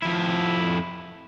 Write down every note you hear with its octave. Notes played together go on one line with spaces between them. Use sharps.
F2 E4